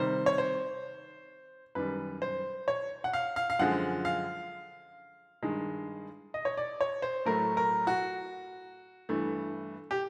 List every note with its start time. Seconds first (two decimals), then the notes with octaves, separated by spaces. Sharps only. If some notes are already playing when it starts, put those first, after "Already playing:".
Already playing: C3 D#3 G3 C5
0.26 C#5
0.38 C5
1.75 F#2 D#3 G3 B4
2.22 C5
2.68 C#5
3.04 F#5
3.13 F5
3.36 F5
3.50 F5
3.59 F#2 D3 F3 G#3 F#5
4.05 F5
5.43 G2 D#3 G#3
6.34 D#5
6.45 C#5
6.57 D5
6.81 C#5
7.02 C5
7.25 A2 F#3 A3 A#4
7.57 A#4
7.87 F#4
9.09 G2 E3 A3
9.91 G4